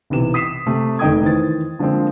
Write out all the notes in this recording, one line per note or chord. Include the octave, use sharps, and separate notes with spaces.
B1 C3 E3 E7
D#6 B6 C7 E7
C3 A3
F1 D#3 D#5 G5 D#6 G#6
D#3 E3 C5 A6
D3 F3 G#3 A#3 C4